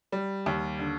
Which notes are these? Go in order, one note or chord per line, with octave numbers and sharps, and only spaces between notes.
G3
D#2
D3